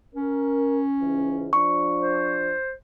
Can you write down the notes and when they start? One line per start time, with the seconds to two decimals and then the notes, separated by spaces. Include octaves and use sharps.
0.15 C#4 A#4
0.99 C#2 G#2 E3
1.53 F3 D4 C#6
2.01 C5